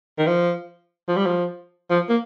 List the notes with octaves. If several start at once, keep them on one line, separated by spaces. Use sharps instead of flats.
D#3
F3
F3
G3
F3
F3
A#3